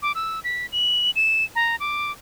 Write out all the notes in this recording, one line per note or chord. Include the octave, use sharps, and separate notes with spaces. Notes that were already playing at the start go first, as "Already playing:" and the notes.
D6
E6
B6
F#7
E7
A#5
D6